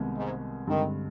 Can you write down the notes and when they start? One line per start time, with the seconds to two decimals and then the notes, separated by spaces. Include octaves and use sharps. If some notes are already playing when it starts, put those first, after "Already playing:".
Already playing: C2 C3 D#3 G#3 B3
0.16 G#2
0.67 G2 D3 D#3 G#3 C4